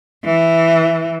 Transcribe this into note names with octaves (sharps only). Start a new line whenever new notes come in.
E3